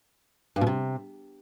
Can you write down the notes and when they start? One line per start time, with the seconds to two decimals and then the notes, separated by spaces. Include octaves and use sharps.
0.56 G2
0.61 B2
0.67 C3